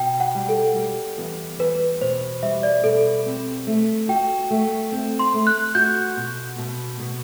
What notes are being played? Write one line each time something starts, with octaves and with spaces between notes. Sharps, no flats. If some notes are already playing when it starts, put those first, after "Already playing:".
Already playing: B2 G5
F#5
G3
A4
G3
E2
E2 B4
B2 C5
G3 E5
D5
B2 A4
C4
A3
F#4 G5
A3
C4
C6
A3
F#6
F#4 G6
B2
B2
B2